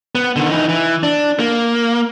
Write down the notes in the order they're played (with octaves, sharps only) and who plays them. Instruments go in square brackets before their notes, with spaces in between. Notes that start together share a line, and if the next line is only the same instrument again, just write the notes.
[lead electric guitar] B3
D3 D#3
E3 D#4
E3
D4
A#3